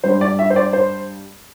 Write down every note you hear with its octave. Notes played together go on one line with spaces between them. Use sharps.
G2 G3 C5
D5
E5
C5
D5
C5